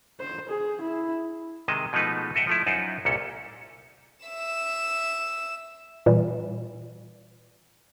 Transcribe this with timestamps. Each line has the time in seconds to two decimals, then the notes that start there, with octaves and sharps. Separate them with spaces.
0.20 C5
0.49 G#4
0.81 E4
1.68 C3 D#3 G#3 D#5 A5
1.93 B2 F3 G#3 A3 D#4 B4
2.35 A4 D#5 E5 F#5 G5
2.47 F3 A3 E4
2.67 F#2 D#4 F4 C5 F#5
3.05 C2 A#2 C#4 A4
4.26 E5 E7
6.06 A#2 E3 G3